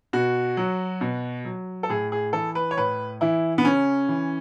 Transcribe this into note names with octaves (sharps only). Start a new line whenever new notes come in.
B2 F#4
F#3
B2
F#3
A4
A2 G#4
G#4
E3 A4
B4
C#5
A2 B4
E3 E4
B3
C#3 C#4
E3